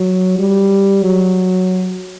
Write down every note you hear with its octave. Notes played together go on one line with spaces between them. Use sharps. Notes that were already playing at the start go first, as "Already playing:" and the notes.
Already playing: F#3
G3
F#3